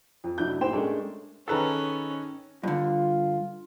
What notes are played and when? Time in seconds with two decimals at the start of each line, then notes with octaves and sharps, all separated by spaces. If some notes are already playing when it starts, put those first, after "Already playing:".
0.24 F2
0.38 F1 F#3 D4 E4 G6
0.61 A2 G4 C5 G5 C6 E7
0.73 G#3 A3 C#4 D4 G#4 A#4
1.48 D#3 C#4 D#4 G#4 A4 B4 A#5
2.63 G2 D3 F4